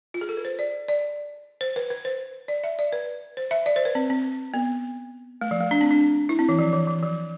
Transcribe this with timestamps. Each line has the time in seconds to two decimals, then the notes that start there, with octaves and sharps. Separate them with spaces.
0.14 F4
0.21 G#4
0.29 A4
0.37 B4
0.45 C5
0.59 D5
0.89 D5
1.61 C5
1.76 B4
1.90 B4
2.05 C5
2.48 D5
2.64 E5
2.79 D5
2.93 B4
3.37 C5
3.51 E5
3.66 D5
3.76 C5
3.85 B4
3.95 C4
4.10 C4
4.54 B3
5.41 A3
5.51 F3
5.60 A3
5.71 D4
5.81 C4
5.91 D4
6.29 E4
6.39 C4
6.49 E3
6.59 F3
6.73 E3
6.88 E3
7.03 F3